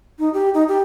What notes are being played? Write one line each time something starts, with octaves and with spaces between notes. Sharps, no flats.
D#4
G4
D#4
G4